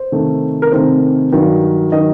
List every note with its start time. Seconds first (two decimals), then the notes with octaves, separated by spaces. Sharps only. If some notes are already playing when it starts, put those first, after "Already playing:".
Already playing: C5
0.12 C3 D#3 A3
0.62 A#4
0.72 C3 D#3 A3 C5
1.32 G2 D#3 F#3
1.92 D#3 F#3 D#5